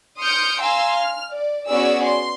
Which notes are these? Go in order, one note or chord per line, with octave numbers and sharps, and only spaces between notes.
C6 D#6 F6 G6 C#7 D7
F5 G#5 A#5 C6 E6
F6
D5
B3 C#4 F#4 G#4 D5 E6
C6